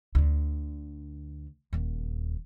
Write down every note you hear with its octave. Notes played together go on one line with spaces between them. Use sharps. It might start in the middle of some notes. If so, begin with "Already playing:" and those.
D2 D3
D#1 D#2